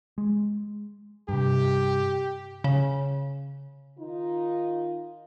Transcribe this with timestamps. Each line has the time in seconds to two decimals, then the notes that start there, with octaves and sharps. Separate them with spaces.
0.18 G#3
1.29 G2 C3 G4
2.64 C#3
3.98 D#3 D#4 F4